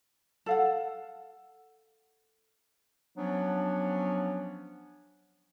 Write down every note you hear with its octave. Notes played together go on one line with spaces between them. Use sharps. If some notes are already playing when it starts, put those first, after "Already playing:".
A4 F5 F#5
F3 F#3 B3 C#4 D4